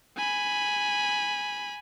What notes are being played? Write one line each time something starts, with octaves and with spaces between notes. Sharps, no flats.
G#5 B5